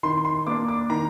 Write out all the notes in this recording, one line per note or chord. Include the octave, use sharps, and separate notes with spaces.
D#3 C6
C6
A#3 D4 D6
D6
D#3 A#5